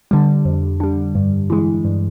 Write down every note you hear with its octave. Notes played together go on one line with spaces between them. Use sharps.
D3 G3
F2
D3 G3
G2
E3 G#3
G2